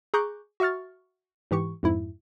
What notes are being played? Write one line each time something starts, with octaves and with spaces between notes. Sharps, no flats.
G#4 A#5 C#6 D6 F#6 G6
F#4 E5 C#6 F6 A6
G#2 E3 G4 C#6
F2 G#2 E4